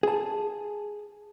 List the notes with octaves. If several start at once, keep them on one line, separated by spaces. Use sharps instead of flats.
G#4 A5